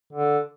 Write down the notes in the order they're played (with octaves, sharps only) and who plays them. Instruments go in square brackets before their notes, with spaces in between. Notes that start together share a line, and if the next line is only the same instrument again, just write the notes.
[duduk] D3